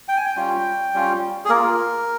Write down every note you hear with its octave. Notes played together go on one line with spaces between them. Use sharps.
G5
G#5
G5
G3 C#4 F4
G3 C#4 F4
G#4
A#3 F4 A#4